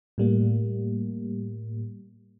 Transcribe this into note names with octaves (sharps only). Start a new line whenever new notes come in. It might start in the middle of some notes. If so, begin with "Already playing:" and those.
A2 G3 A#3